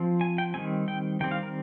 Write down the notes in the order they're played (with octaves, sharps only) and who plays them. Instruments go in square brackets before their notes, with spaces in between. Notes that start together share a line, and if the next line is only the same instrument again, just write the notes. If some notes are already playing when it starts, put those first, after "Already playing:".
Already playing: [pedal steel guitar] F3 C4
G#5
G5
D#3 G3 C4 G#5
G5
D#3 G3 C4 G5
F5
A#4